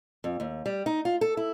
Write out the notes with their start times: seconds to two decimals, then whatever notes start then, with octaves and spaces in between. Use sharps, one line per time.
0.24 F2
0.40 D#2
0.66 G3
0.86 D#4
1.05 F4
1.21 A4
1.37 E4